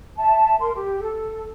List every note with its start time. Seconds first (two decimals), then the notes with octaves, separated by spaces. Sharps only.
0.18 E5 A5
0.60 A#4 C6
0.73 G4
1.00 A4